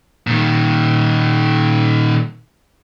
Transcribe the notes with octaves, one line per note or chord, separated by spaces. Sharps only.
A#2 D#3